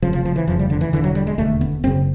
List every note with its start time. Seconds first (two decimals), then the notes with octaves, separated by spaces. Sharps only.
0.02 F1 F2 C#3 F3
0.13 F3
0.25 F3
0.36 E3
0.47 F1 F2 C#3 F3
0.59 G3
0.70 D3
0.81 E3
0.93 E1 D#2 D3 E3
1.04 F#3
1.15 G3
1.27 G#3
1.38 E1 D#2 D3 A3
1.61 B3
1.83 F#1 F#2 C#3 C4